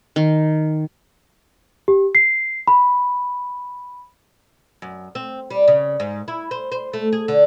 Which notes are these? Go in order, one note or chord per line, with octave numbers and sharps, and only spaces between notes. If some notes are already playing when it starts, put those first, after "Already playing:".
D#3
G4
C7
B5
F#2
C4
G3
C#3
G#2
E4
C5
C5
A3
G#4
D3